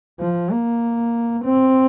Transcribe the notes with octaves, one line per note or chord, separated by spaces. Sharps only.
F3
A#3
C4